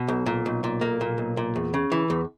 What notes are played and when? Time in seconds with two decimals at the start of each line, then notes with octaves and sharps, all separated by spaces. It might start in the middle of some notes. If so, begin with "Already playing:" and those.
Already playing: B2
0.08 B1
0.26 A#2
0.46 B1
0.64 A#2
0.81 B1 A#3
1.01 A#2
1.18 B1
1.37 A#2
1.56 E2
1.74 C#3
1.92 E3
2.10 E2